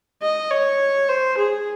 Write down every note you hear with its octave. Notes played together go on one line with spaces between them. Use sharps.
D#5
C#5
C5
G#4